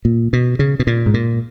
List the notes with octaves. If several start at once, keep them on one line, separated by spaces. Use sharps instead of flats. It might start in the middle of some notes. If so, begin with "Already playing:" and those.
A#2
B2
C#3
B2
A#2
G#2
A#2